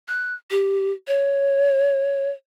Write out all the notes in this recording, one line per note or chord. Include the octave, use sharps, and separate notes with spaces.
F#6
G4
C#5